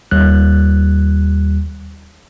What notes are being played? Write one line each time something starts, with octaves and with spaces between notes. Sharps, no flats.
D#2 G3 F#6